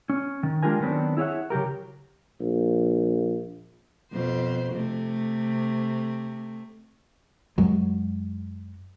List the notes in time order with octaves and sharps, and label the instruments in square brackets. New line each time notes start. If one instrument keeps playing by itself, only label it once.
[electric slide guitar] C#4
D#3
G#3 D4 F4 G4 A#4 G#5
D#3 F#3 B3 C4 D4
E4 G#4 C#5 E5 F#5
C#3 F#3 G4 A#4
[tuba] A#1
[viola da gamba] F2 B2 C5
C3 A3
[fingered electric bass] F#2 F#3 G#3